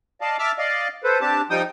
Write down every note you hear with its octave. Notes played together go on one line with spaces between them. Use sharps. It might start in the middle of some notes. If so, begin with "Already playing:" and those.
D5 D#5 F5 A5
E5 A5 D6 E6 F6
D5 D#5 F5
A4 B4 C5
C4 D4 G4 A5
F3 G3 D#4 G5 D#6